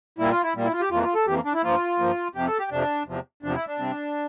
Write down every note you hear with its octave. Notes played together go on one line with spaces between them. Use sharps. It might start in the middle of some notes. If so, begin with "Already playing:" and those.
A#2 G3 A#3 E4
F4
E4
A#2 G3 A#3
E4
F4
G4
F2 E3 A#3 F4
F4
A4
F2 E3 A#3 G4
D4
E4
G2 F3 A#3 F4
G2 F3 A#3
F2 C3 F3 G4
A4
G4
F2 C3 F3 D4
E2 C3 F3
E2 C3 F3 D4
E4
D4
C3 G3 C4